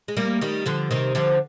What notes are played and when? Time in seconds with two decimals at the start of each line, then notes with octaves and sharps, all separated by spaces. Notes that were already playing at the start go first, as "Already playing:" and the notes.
0.08 G#3
0.17 G3 A#3
0.41 D#3 G3
0.66 D3 F3
0.91 C3 D#3
1.15 D3 F3